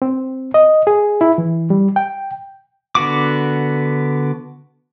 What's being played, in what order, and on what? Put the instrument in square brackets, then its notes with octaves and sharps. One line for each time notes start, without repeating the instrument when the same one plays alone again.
[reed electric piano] C4
D#5
G#4
E4
E3
G3
G5
[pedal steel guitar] D3 B3 F#4 D6